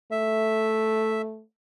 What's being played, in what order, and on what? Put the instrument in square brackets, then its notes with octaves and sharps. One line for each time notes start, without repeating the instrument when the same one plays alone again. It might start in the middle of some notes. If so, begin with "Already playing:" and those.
[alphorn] A3 [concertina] E5